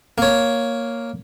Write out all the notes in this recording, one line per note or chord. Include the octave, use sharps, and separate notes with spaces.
A#3 C#5